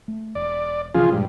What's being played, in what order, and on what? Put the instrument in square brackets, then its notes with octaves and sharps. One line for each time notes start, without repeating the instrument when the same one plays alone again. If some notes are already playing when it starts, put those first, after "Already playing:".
[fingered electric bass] A3
[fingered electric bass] E1 [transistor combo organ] D5
[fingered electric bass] C3 E3 C#4 [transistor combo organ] F3 F4 G#4
[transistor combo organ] G2 [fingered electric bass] A#2 G3 G#3